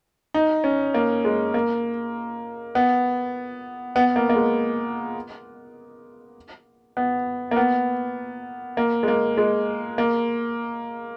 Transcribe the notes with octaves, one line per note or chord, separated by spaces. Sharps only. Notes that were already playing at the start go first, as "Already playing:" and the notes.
D#4
C#4
A#3
G#3
A#3
B3
B3
A#3
A#3
G#3
B3
A#3
B3
A#3
G#3
A#3
G#3
A#3